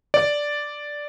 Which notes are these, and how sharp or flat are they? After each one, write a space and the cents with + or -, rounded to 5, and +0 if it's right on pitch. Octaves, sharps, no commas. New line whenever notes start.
D5 -5